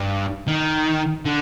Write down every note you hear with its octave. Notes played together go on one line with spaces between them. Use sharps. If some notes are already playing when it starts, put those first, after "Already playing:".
Already playing: G2
D#3
D3